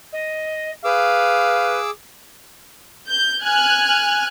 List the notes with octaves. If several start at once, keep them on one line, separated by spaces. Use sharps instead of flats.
D#5
G#4 B4 F5 D6 E6
G6
G#5 F6 F#6 G#6